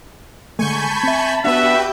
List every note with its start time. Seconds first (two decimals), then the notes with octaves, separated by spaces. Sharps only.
0.59 D3 G#3 A3 G#5 A5 B5 C#6 G6
1.03 C4 E5
1.44 B3 D4 F#4 G4 B4 E5 G5 G6